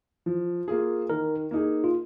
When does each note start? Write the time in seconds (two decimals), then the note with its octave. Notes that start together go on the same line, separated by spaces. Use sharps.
0.26 F3
0.68 A#3 F4 G#4
1.10 D#3 A#4
1.51 A#3 D#4 G#4
1.84 F4